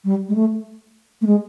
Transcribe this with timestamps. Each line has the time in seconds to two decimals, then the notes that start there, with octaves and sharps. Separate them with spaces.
0.05 G3
0.29 G#3
0.35 A3
1.22 A3
1.27 G#3